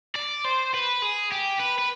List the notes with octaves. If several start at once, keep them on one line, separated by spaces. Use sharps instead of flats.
D5
C5
B4
G#4
G4
B4
B4